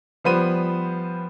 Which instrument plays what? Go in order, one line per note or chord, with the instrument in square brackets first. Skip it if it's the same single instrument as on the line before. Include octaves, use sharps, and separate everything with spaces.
[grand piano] F3 G3 B3 C5 B5 D#7